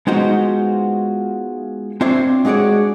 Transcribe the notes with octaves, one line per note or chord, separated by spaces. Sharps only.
G#3 B3 D#4 F4 F#4 C5
C4 D4 F4 C5 C#5 E5
G#3 D4 F#4 G#4 C#5 D5